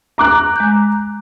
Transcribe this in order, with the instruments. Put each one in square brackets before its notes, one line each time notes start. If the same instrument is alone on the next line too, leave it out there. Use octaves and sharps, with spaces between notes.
[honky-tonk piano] A#5 D6 F#6
[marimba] G#3 G6